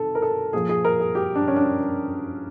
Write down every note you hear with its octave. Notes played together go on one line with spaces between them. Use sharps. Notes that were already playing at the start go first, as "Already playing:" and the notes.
Already playing: C3 D#3 A4
A#4
A4
A#2 F3 G#4
G#4
A#4
G#4
G4
D4
C#4
D4